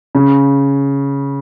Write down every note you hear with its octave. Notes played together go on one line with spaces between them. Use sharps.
C#3